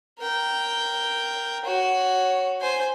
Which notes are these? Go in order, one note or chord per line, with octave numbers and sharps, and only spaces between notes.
A#4 G5
F#4 C#5
C5 G#5